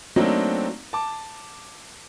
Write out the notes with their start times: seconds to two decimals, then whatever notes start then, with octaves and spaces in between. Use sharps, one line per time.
0.16 F#3 A3 A#3 C4 D4 D#4
0.93 A5 D6